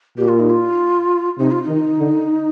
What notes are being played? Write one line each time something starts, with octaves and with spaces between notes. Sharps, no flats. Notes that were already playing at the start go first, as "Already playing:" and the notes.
A#2 G4
F4
D#4
F4
C3 D#4
F4
D#4
D#3
D3